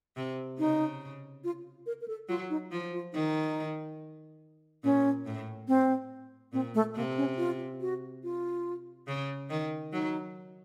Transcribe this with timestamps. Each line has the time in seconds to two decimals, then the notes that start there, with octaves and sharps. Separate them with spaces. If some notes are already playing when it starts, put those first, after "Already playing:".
0.16 C3
0.59 C#3 D#4
1.44 F4
1.86 A#4
2.01 A#4
2.08 A4
2.29 F#3 F4
2.50 D#4
2.72 F3 F4
2.93 F4
3.13 D#3 D#4
4.83 A#2 C#4
5.26 A2
5.68 C4
6.53 A#2 C4
6.75 A3
6.96 C3 A#3
7.18 C#4
7.38 F4
7.81 F#4
8.23 F4
9.08 C#3
9.50 D#3
9.92 F#3 D#4